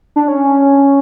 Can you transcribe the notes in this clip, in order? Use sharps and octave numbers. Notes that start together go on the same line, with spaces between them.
D4
C#4